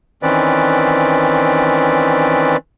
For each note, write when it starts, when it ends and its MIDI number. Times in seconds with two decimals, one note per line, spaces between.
0.23 2.57 51
0.23 2.57 52
0.23 2.57 60
0.23 2.57 61
0.23 2.57 71
0.23 2.57 74